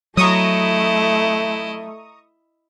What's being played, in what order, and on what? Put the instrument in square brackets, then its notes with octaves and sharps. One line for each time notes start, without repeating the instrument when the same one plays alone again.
[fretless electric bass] F#3 [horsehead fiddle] A3 [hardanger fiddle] E4 D#5 [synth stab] A#5 C#6 D#6